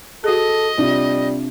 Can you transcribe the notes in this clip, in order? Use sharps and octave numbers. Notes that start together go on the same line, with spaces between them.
F#4 G#4 A4 D#5
C3 G3 D4 F4